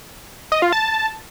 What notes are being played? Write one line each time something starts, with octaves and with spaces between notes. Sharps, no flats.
D#5
F4
A5